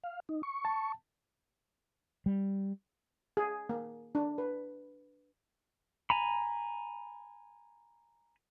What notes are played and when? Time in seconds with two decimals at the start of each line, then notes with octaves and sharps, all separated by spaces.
0.04 F5
0.29 D#4
0.43 C#6
0.65 A5
2.26 G3
3.37 G#4
3.69 A#3
4.15 D4
4.38 B4
6.10 G#5 A#5 B5